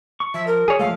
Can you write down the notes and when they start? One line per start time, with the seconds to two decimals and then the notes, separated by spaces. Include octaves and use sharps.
0.20 C#6
0.34 F3 E5
0.47 A#4
0.68 G#4 C#5
0.79 F3 G#3 A3 F5